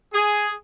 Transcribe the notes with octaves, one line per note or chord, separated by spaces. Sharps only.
G#4